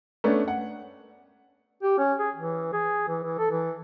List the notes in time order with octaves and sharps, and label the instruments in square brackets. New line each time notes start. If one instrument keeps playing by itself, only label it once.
[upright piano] A3 B3 C#4 D4
F#5
[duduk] G4
C#4
G#4
E3
G#4
E3
E3
A4
E3